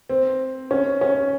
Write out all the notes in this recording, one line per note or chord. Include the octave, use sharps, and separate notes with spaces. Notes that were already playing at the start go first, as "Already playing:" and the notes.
C4
C#4
C#4